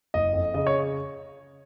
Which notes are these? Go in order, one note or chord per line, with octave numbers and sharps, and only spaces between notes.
F#1 D#5
F2
C#3 D#5
C#5